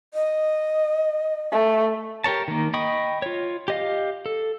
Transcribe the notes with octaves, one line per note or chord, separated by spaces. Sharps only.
D#5
A3
G4 A#4 C#5 A5
D#3 A#3
D#5 G5 B5 C#6 D#6
F4 C#5
G4 D#5 F5
A4